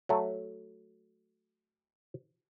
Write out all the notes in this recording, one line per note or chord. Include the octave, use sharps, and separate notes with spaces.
F#3 A3